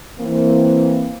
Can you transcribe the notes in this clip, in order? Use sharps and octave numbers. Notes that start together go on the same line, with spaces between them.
E3 A#3 C4